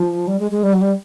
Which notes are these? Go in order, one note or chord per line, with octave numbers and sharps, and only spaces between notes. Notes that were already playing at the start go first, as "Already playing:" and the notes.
Already playing: F3
G3
G#3
G#3
G3
F#3
G3